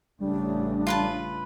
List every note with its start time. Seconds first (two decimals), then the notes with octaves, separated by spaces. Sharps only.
0.20 A1 C#3 G3 A3 D4
0.87 F4 B4 A5